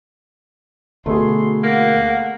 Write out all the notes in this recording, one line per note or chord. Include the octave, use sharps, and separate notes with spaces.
D2 B2 A3 B3 G#4 C6
A#3 A#4 F#5